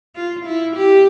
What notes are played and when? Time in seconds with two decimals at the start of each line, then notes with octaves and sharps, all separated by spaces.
0.15 F4
0.45 E4
0.76 G4